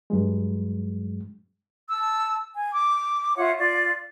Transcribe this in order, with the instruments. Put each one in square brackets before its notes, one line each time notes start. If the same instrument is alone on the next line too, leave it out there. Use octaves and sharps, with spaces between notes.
[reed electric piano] G2 F#3 G#3
[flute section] A5 E6
G#5
D6
F4 C#5 E5 F#5
F4 D5